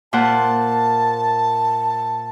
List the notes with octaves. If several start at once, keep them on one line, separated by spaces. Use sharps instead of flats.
A#2 C5 F#5 A5